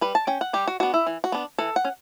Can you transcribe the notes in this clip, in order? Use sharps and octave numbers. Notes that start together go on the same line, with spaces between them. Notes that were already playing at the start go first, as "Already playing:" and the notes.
G3 B4
A5
C#4 G5
F#5
G3 G4
F#4
B3 D4 F#4
E4
E3
F#4
B3 D4
E3 A4
F#5
C#4